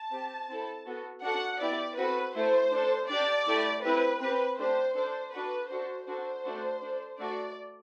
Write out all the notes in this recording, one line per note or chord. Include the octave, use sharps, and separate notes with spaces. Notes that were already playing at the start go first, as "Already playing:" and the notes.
Already playing: A5
C4 G4
C4 E4 A4
B3 F#4 A4
D4 F#4 A4 F#5
B3 E4 G4 D5
C4 F#4 A4 B4
A3 E4 A4 C5
D4 A4
D4 G4 D5
A3 E4 G4
C4 E4 G4 B4
C4 G4 B4
A3 D4 G4 C5
D4 A4 C5
D4 F#4 A4 B4
D4 F#4 A4 C5
D4 F#4 A4 C5
A3 D4 F#4 A4
D4 A4
A3 D4 F#4 A4 D5